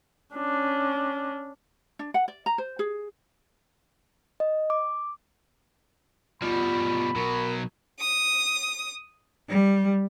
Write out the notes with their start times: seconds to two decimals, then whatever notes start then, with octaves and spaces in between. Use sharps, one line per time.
0.35 C#4 D4
1.99 D4
2.14 F#5
2.28 D5
2.46 A#5
2.58 C5
2.79 G#4
4.40 D#5
4.70 D6
6.42 B2 G3 F4 B5
7.16 B2 F#3 A#4
7.99 D#6
9.49 G3